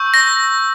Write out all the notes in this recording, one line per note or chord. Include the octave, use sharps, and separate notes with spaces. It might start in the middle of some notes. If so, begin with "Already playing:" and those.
Already playing: C#6 E6 G6
A#6